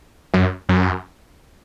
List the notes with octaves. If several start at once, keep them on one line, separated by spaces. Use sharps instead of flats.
F#2
F#2